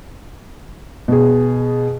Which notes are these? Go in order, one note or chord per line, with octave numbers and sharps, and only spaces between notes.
B2 G#4